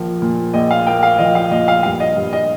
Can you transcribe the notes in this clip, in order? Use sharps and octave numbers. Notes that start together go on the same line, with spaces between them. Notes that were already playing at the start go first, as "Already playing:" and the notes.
Already playing: A#1 F3 A#3
A#2
A#1 D#5
F5
A#3 G5
F5
F3 D#5
F5
A#2 D#5
F5
G2 F5
D#5
G2
D#5